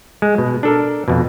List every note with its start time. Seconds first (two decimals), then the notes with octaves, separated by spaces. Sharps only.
0.22 G#3
0.38 B2
0.63 D4 A4 A#4
1.08 F2 B2